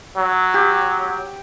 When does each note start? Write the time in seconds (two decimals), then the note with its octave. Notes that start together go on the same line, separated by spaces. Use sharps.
0.17 F#3
0.54 G4